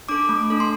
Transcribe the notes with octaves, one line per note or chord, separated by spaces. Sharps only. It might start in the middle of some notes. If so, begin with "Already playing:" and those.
D4 A4 D6
A3
D4 A4
C6